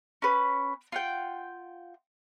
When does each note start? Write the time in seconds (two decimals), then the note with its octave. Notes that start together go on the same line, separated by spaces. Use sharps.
0.22 C#4 B4
0.92 F4 F#5 G5